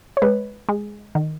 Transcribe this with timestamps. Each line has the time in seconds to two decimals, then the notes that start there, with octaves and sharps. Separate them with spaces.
0.17 C#5
0.22 G#3 B4
0.69 G#3
1.15 D#3